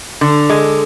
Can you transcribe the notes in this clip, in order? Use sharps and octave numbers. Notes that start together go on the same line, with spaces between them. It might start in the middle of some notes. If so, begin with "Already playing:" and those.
D3
G#3